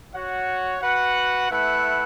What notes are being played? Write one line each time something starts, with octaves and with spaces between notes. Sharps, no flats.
F#4 C#5 F#5
F#4 B4 F#5
A3 E4 B4 F#5